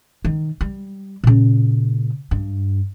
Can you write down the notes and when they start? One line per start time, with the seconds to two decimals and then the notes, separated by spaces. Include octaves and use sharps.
0.25 D#3
0.61 G3
1.24 A#2 C#3
2.31 G2